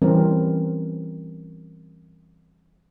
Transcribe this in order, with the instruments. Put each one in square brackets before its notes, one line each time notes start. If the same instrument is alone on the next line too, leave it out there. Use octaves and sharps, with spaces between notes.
[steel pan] E3 G3 C4 C#4 A#4